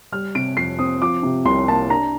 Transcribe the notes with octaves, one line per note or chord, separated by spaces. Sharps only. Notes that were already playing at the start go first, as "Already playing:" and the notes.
G3 F6
C3 D7
F2 C7
C4 D#6
F3 D6
C3
C2 C6
A#3 A5
D4 A#5